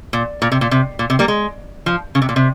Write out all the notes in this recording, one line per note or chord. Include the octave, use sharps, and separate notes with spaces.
A#2
A#2
C3
A#2
C3
A#2
C3
G3 A#3
G#3
F3
C#3
C3
A#2
C3